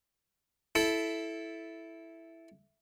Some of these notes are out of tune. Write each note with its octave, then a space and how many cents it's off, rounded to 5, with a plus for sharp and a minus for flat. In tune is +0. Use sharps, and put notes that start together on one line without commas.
E4 +0 A4 -10